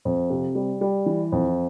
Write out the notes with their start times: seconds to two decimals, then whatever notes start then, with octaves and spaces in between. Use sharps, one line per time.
0.05 F2
0.30 C3
0.55 G3
0.81 G3
1.06 E3
1.32 F2